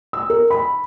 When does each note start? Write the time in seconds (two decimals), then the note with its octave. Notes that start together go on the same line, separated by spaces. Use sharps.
0.13 E6
0.30 A#4
0.50 B5